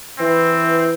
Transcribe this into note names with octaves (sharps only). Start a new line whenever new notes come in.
E3 C4